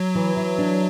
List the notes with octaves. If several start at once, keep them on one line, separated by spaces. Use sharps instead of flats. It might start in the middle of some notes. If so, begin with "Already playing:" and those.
Already playing: F#3
E3
E3
D4